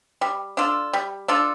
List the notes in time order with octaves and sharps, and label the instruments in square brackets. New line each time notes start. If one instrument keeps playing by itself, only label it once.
[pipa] G3
D4 F4 A4
G3
D4 F4 A4